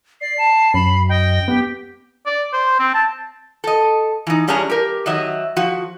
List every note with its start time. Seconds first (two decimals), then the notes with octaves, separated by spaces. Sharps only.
0.21 D5 C7
0.38 A5
0.74 F#2 B5
1.09 D#5 G5
1.48 B3 G4
2.26 D5
2.53 C5
2.79 C4
2.94 A5
3.64 A4 D#5
4.27 E3 D#4
4.48 G2 G3 C#4 D4 G#4 A#5
4.70 G4 A#4
5.06 D#3 F#3 D#5 E5
5.57 F3 F#4